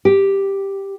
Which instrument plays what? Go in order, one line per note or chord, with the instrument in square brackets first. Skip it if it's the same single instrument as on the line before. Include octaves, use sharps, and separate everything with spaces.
[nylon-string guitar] G4